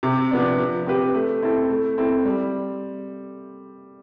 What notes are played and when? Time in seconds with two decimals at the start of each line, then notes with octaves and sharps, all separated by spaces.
0.03 C3
0.31 F3 B3 D4
0.58 F3
0.86 C4 G4 B4
1.15 A3
1.42 C4 E4 A4
1.70 A3
1.98 C4 E4 A4
2.25 G3